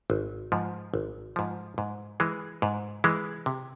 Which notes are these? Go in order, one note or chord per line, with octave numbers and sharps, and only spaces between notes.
G#1
G#2 F3
G#1
G#2 F3
G#2
E3 G#3
G#2
E3 G#3
C3